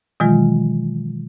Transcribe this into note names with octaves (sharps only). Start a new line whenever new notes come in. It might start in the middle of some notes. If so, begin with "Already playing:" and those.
B2 D#3 E3 F#3 G#3 F4